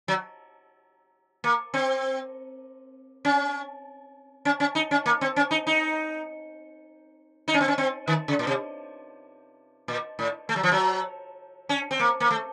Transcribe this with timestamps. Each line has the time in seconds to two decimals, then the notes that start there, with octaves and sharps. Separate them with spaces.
0.08 F#3
1.44 A#3
1.74 C4
3.25 C#4
4.45 C#4
4.60 C#4
4.75 D#4
4.91 C#4
5.06 A#3
5.21 C4
5.36 C#4
5.51 D#4
5.67 D#4
7.48 D#4
7.54 C#4
7.61 C4
7.68 C#4
7.78 C4
8.08 D#3
8.28 C#3
8.39 A#2
8.47 C3
9.88 A#2
10.19 A2
10.49 A3
10.56 F#3
10.63 F3
10.72 F#3
11.69 C#4
11.91 C4
12.00 A#3
12.20 A#3
12.31 A3